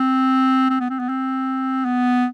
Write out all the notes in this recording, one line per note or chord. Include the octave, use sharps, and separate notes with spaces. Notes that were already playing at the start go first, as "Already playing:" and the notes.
Already playing: C4
C4
B3
C4
B3
C4
B3